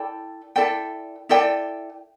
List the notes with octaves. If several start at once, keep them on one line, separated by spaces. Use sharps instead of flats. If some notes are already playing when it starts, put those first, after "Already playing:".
Already playing: E4 A4 D5 G5
E4 A4 D5 G5
E4 A4 D5 G5